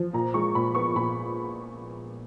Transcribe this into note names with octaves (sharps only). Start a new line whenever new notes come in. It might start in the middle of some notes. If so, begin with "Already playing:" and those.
Already playing: F3
A#2 A#5
G#3 C#6
A#2 B5
B3 C#6
A#2 B5